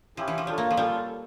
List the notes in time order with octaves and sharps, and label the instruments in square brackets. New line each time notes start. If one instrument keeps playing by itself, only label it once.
[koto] F3 [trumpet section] C#4 E4 G4
[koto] E3
F3
[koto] G3 [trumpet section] D4 F4 A4 C#5
[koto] A#3
F3
[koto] G3 [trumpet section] C#4 F4 A4